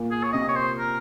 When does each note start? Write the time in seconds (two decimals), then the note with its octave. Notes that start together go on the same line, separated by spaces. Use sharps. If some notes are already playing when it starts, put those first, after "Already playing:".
Already playing: A#2
0.11 G#4
0.23 C#5
0.33 C3 D#5
0.49 C#5
0.56 C5
0.78 A#4